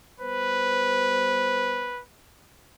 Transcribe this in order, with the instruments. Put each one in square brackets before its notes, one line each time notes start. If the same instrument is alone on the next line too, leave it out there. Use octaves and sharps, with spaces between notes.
[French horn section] G3 B3 C5 [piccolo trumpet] B4